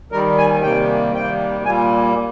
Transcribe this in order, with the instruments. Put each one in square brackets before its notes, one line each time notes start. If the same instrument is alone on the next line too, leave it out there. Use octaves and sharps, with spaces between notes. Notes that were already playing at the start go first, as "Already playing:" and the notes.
[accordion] D#2 D#3 G3 A#4
G#5
C3 D#3 G3 A#3 G5
C3 D#3 G3 A#3 G5
A#2 G3 A#3 G#5